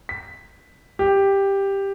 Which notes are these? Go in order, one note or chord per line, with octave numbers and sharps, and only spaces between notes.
B6
G4